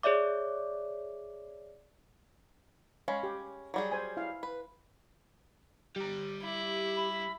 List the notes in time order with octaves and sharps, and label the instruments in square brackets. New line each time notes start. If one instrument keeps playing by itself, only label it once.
[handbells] G#4 C#5 D5 E5 D6
[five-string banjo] G#3 C#4 [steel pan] C#5 F5 B5
[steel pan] G4
[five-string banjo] F#3 G3 G#4
[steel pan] C5 G#5
E4 F5
[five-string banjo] B4
[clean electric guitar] G3 [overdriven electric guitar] G4 A#5
[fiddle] E4
[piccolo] B5